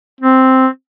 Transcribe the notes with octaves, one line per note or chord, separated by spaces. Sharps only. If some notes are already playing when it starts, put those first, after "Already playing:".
C4